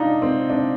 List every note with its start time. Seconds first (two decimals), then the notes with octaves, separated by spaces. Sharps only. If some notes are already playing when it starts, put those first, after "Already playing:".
Already playing: D4 D#4 F4
0.22 C4
0.50 D4